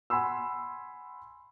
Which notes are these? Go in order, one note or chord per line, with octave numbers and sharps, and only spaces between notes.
F#5 G#5 B5 C6 E6